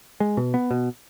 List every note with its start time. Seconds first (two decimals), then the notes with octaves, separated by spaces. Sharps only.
0.20 G#3
0.37 B2
0.54 B3
0.71 B2